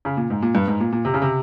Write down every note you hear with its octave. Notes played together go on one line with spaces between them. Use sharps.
C#3
A#2
G#2
A#2
G2
G#2
A#2
A#2
C3
C#3
C3